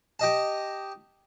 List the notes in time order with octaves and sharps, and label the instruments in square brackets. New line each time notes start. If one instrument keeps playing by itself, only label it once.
[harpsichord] G4 D#5 A5